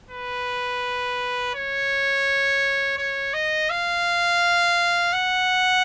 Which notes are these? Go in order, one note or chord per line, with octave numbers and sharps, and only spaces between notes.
B4
C#5
C#5
D#5
F5
F#5